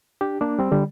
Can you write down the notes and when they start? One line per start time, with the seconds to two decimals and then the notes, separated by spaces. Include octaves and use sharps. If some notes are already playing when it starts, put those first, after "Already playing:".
0.21 D4 G4
0.41 A#3 D4
0.59 G3 C4
0.72 D3 G3